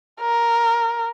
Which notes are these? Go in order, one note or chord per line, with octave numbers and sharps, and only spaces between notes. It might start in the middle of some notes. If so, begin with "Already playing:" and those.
A#4